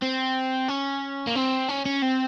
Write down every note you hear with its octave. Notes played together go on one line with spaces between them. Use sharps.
C4
C#4
A#3
C4
C#4
C#4
C4